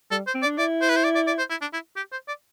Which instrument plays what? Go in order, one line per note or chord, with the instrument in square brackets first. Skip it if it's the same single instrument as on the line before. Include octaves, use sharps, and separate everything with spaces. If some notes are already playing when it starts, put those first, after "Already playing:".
[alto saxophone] G3 [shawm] A4
[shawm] C5
[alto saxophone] C4
[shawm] D5
[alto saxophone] D4
[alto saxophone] E4 [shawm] D5
[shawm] C5
B4
C5
D5
D5
D5
C5
E4
D4
E4
G4
C5
D5